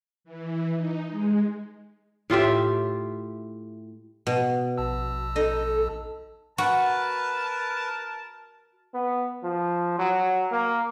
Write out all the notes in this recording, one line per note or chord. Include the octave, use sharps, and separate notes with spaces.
E3
D#4
G#3
A2 F4 G4 E5
B2
A#1 A5 E6
D#4 A4 D#5
F#4 A#4 B4 A5
B3
F3
F#3
A#3